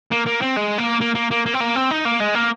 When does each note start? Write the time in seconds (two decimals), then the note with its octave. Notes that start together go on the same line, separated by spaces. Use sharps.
0.11 A#3
0.26 A#3
0.41 C4
0.56 G#3
0.78 A#3
1.01 A#3
1.15 A#3
1.31 A#3
1.46 A#3
1.54 C4
1.61 A#3
1.76 C4
1.91 D#4
2.05 A#3
2.20 G#3
2.35 A#3